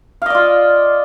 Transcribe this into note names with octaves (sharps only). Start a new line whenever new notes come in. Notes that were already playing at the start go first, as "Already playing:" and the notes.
F4 D5 D#5 F5